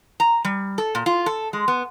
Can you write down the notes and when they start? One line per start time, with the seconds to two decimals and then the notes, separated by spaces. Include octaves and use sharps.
0.20 A#5
0.45 G3
0.78 A4
0.95 A#2
1.06 F4
1.26 A4
1.53 G#3
1.68 B3